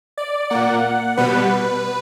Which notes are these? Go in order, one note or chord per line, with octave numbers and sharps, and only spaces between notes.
D5
A#2 A#3 F#5
B2 G3 B3 B4